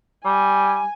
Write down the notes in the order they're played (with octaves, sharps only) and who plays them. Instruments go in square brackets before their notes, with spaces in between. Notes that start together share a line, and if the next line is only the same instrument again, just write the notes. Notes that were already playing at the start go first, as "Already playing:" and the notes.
[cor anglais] G3 [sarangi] G#5